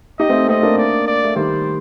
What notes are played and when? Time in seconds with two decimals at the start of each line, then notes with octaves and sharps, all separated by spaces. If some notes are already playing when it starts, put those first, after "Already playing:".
0.19 D#4 G4 D#5
0.29 A3 C4
0.48 A3 C4 D#5
0.63 A#3 D4
0.77 D5
1.07 D5
1.24 A3
1.36 D#3 G3 C5